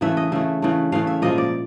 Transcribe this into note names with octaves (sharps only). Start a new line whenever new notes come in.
C#3 E3 A3 E5
D#5
C#3 E3 A3 E5
C#3 E3 A3
C#3 E3 A3 F5
E5
A#2 F3 G#3 D#5
D5